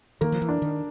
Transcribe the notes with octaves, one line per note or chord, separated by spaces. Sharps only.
D#3 A#3
F3
E3
D4
D#3